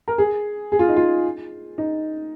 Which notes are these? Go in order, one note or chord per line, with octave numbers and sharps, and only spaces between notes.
A#4
G#4
G#4
F4
D#4
F4
D#4